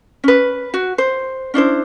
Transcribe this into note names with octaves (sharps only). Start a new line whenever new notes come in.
C#4 B4
F#4
C5
C#4 D4 E4 C5